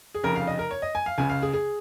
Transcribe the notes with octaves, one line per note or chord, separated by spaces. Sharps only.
G#4
F1 F2 C#3 A#4
F5
D#5
A#4
C#5
D#5
G#5
F5
C#2 C#3 G#5
F5
G#4
G#4